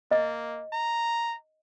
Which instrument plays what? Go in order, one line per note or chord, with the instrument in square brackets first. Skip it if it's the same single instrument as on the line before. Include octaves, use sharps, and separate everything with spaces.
[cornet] A#3 [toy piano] D#5
[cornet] A#5